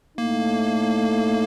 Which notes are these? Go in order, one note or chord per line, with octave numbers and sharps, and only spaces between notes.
A2 A3 A#3 D#4